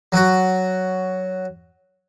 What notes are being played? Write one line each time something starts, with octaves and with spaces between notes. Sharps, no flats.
F#3 F#4